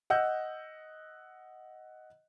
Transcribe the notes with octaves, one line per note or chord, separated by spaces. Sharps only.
D#5 F#5 E6 G6